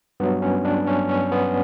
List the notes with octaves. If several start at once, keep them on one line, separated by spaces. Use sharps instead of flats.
G2 F#3 B3
C#4
D4
C#4
C#4
B3